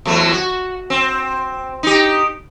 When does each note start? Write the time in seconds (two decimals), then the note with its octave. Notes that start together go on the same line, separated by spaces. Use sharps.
0.05 E2 F#3 A3
0.32 F#4
0.90 C4
1.83 D#4 G4